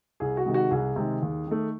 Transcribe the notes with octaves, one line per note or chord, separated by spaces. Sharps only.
C2 G#4
F#4
C3 D#3 G#3
F#4
C2 G#4
C3 D#3 G#3
D#2
D#3 A3